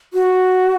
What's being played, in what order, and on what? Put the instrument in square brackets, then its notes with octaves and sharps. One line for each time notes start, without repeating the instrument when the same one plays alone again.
[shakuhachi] F#4